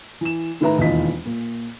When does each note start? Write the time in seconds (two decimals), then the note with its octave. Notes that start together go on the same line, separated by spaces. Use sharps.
0.21 E3 E7
0.61 A2 D#3 E4 B4 E5 A#5
0.78 E1 D#2 E3 F4 D#5 B6
1.25 A#2